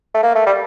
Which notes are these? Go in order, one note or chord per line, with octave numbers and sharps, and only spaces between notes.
A3
A#3
A3
G3